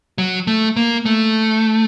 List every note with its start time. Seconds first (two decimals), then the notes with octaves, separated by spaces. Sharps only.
0.18 F#3
0.47 A3
0.76 A#3
1.06 A3